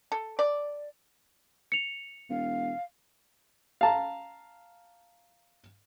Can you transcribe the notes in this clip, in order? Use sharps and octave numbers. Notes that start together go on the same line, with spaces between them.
A4
D5
C#7 F7
E1 F5
F5 A5 A#5